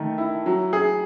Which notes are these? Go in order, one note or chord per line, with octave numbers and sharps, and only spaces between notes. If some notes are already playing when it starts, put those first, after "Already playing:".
Already playing: D#3 A3
E4
F#3
G#4